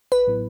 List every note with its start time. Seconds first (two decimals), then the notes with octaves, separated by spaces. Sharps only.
0.12 A1 B4
0.27 A2 F#3 B3 E4